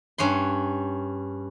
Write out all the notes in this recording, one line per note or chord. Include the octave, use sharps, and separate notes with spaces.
G2 C#4 F#5 C6